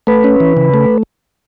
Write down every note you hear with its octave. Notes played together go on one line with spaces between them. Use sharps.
A3 B4
C#4
E3
C#3
A3